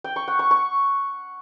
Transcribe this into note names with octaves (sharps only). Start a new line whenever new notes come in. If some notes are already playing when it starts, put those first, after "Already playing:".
G5
C#6
F#5
C#6
C#6